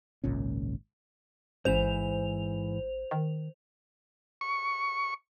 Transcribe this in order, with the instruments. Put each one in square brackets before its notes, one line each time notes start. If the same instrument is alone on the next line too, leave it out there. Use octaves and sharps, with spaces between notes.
[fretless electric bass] G#1 C#2 A#2 C#4
[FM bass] A1 [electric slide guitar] G#2 E3 [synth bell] C5 F7
[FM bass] D#3
[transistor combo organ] C#6